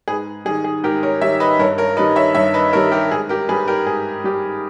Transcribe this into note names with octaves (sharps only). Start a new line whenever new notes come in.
G#2 G#4 B4
D#3 G3 G#4
G#4
G#2 G4 A#4
A#4 C#5
D#3 G3 C#5 E5
B4 D#5
G2 A#4 C#5
A#4 C#5
D#3 G3 B4 D#5
C#5 E5
G2 C#5 E5
B4 D#5
D#3 G3 A#4 C#5
G4 A#4
G#2 G#4
G4 A#4
G3 G#4 B4
G4 A#4
G#2 G#4
G3 G4